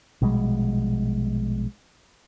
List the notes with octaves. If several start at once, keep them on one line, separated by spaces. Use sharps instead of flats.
A#1 B2 G3 G#3